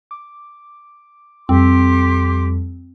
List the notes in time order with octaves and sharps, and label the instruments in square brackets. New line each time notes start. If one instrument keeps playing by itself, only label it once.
[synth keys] D6
[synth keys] F2 G3 A4 [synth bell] C4 [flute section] G4 C6 D6